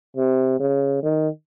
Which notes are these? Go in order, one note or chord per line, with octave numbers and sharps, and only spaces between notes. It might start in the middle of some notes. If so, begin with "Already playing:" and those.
C3
C#3
D#3